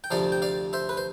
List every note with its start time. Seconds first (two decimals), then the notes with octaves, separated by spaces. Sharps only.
0.04 G5
0.11 D2 C3 F3 D5 F5
0.32 G5
0.42 D5 F5
0.73 C5 E5
0.89 B4
0.97 C5